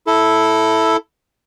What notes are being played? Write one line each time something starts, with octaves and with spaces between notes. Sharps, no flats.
E4 A4